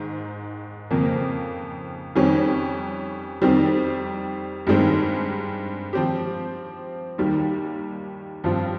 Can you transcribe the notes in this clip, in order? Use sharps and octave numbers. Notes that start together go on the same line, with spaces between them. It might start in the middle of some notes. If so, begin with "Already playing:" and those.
Already playing: G#2 D#3
F2 C#3 F3 A#3
F2 D#3 G3 C#4
F2 D#3 G3 C4
G2 D#3 G#3 C4
F3 C4 G4
D#2 D#3 G3
G2 F3 C4 F4